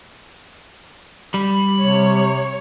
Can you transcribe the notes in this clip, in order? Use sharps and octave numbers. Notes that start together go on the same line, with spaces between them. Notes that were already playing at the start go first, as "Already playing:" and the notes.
G3 B5
C3 C#5